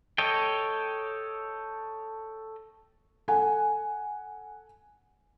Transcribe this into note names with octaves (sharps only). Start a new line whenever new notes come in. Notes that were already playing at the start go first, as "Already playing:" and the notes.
A4 C#5 D#5 G5
A4 F#5 G#5